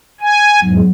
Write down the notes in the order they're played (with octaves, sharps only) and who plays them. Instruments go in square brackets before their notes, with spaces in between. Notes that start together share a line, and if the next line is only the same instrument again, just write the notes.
[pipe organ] G#5
[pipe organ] E2 G#2 [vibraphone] F#3